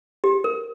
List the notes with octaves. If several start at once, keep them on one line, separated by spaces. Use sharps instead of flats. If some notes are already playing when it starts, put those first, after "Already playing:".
G4
A#4